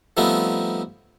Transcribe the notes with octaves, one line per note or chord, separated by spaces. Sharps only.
F3 G3 A3 B3 C4 D#4